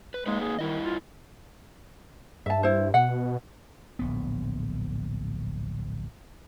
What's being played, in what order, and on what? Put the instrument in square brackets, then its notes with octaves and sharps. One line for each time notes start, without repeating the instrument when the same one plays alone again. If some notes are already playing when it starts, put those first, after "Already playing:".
[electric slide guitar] B4
[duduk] G#3 [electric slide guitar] A#3 D#4 B4
[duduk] G#4
[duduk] D#3 [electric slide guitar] G3 E4 D#5
[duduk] F4
[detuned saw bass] G2 [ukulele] E5 A5
[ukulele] E4 C5
[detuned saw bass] B2 [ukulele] F#5
[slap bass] D1 A#1 B3